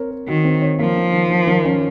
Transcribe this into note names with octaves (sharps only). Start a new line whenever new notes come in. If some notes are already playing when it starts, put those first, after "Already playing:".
Already playing: C4 A#4 C#5
A#4
D#3 F#4
C4
C#5
F3 A#3
D#3
D#3
D#3
D#3
C#4